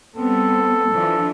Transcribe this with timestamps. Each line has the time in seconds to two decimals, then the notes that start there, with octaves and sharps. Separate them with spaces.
0.16 G3 B3 C4 A4
0.93 E3 F3 D4